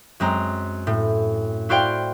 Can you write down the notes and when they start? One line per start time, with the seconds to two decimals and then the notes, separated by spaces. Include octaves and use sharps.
0.20 F#2 G#3 C4 A#5
0.87 A2
1.69 E4 F#4 C5 D5 F5 G5